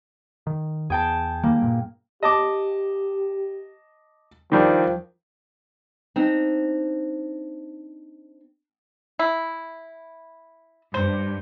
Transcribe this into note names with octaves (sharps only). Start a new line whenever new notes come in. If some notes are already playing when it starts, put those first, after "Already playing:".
D#3
E2 G#4 G5 A5
D#3 G3 A#3
G2 A#2
G4 D#5 A5 D6
D#3 F3 G3 D4
C4 D4 D#4
E4
G2 C5